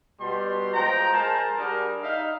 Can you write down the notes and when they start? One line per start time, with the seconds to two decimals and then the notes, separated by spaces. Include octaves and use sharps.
0.21 B2 G3 C6
0.74 F3 G#3 G5 A#5
1.12 G#4 A#4 C5 A5
1.57 G3 D4 F#4 G#4 A#4
2.02 D#4 E5 F5